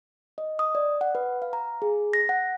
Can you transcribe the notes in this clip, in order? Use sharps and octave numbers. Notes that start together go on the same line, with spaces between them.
D#5
D#6
D5
F#5
B4
F5
A#5
G#4
A#6
F#5